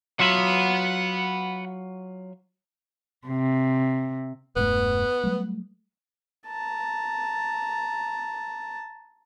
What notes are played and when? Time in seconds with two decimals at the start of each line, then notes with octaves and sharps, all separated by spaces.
0.19 F#3 F4 E5 F#5 B5
3.27 C3
4.56 E1 G2 A3 B3
5.24 F#3 G3 A3
6.47 A5 A#5